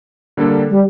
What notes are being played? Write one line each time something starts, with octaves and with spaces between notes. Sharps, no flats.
D3 G3 A#3 D4 A4
G3